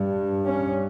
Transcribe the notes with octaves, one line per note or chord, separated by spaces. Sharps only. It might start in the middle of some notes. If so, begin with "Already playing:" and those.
Already playing: G2
C#4